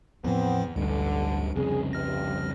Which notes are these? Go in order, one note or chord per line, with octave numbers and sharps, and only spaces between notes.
E2 A2 F3 B3 C4
A1 D2 G2 D3
C2 F2 C#3 G#4
G2 C3 F6 A#6